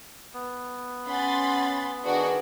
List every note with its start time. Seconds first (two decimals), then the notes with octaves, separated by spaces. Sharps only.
0.34 B3
1.07 C#4 F#5 G#5 B5 C6 A6
2.04 D#3 D4 F#4 G#4 B4 F#5